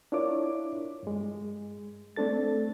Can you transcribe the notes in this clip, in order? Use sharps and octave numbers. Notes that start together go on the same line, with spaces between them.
D4 E4 F4 A#4 C#5 D6
G2 G#3
A3 C4 D4 A4 A6